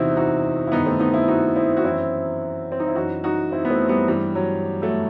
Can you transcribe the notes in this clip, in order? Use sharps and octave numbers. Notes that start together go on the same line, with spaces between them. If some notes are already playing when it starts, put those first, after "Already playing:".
Already playing: E2 C3 E3 C4 D#4 E4 F#4
D#4 F#4
E4
G2 D#3 B3 D#4
A3 C4
B3 D#4
C4 E4
D#4 F#4
C4 E4
F#4
F#2 E3 C4 E4
C4
D#4
E4
F#2 E3 D#4 F#4
D#4 F#4
C4 E4
B3
A3 C4
G3 B3
G2 E3 G3
F#3
F#3 A3